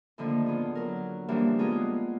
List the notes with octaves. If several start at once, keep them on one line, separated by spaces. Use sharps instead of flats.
A2 D3 D#3 F3 A#3
B3 F4 G#4
F#3 A#4
C#3 E3 F3 G3 A#3 D4
G#3 A#3 B3 F4 G#4